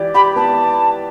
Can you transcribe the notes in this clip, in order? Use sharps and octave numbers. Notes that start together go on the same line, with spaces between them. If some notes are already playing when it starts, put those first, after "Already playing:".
Already playing: E3 G4 D5
G4 B5
B3 A5